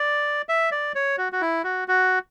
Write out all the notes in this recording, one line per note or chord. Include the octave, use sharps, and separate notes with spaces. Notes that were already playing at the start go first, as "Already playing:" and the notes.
Already playing: D5
E5
D5
C#5
F#4
F#4
E4
F#4
F#4